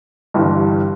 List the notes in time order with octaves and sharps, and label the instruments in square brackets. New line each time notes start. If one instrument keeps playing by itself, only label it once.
[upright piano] G1 G2 E3 G3